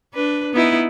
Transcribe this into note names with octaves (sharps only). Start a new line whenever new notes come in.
D4 B4
B3 D#4 E4